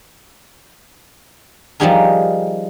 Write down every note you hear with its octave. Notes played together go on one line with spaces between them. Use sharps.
F3 G3 D#4 G4 G#4 A#4